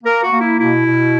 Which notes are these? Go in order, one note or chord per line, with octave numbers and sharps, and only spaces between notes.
A#3 A#4
F#4
A#3
E4
B2 E4
B2